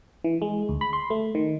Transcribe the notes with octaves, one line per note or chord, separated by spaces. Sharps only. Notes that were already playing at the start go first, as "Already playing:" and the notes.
E3
G#3
D2
B5
C6
A3
D#3